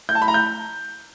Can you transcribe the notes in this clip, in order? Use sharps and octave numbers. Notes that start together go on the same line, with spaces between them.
G6
A5
B5
A#5
G6